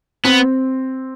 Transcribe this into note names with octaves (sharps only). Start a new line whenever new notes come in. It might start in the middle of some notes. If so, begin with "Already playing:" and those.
B3 C4